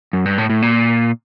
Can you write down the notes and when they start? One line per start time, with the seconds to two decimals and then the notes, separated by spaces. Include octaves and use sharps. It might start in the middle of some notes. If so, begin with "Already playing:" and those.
0.13 F#2
0.26 G2
0.38 A2
0.50 A2
0.62 A#2